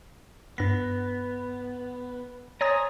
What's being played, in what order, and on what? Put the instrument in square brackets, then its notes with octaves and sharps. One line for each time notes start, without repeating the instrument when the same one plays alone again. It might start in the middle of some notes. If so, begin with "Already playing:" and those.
[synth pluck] G2 A#6 [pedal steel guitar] B3
[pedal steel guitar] C5 G#5 A#5 [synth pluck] C#5 D#6 A6